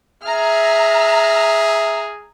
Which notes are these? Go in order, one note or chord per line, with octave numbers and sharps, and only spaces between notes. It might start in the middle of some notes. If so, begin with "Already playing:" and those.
G#4 E5 A#5 F6